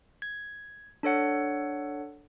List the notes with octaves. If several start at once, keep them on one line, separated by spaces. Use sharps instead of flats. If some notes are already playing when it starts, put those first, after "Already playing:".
G#6
D4 A4 C#5 F#5